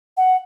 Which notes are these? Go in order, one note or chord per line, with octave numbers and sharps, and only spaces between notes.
F#5